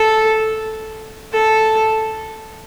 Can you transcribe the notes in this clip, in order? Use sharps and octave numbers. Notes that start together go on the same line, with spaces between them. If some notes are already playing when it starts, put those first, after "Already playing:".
Already playing: A4
A4